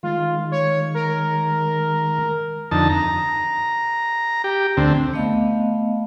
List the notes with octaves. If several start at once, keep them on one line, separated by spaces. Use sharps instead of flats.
D#3 G#3 F4
C#5
A#4
F2 D3 D#4 A5
A#5
G4
D2 D3 C4
A3 B3 D#5 F5